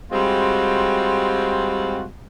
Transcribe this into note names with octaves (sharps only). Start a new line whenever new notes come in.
G3 G#3 C4 F4 F#4